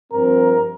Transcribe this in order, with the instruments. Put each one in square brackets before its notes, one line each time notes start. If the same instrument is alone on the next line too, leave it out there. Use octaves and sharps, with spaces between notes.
[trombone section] G2 F3 C4 A#4